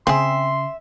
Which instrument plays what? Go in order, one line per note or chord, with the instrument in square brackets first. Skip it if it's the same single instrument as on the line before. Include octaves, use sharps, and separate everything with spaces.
[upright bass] C#3 [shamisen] C4 G#4 [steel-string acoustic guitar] E5 [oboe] C6